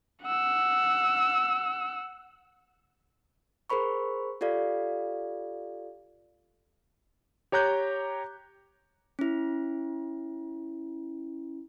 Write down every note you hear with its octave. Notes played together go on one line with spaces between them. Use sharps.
F#5 E6
G#4 A#4 C5 B5 C#6
F4 G4 A4 D5 F5
G4 C#5 A#5 F#6 G6
C#4 E4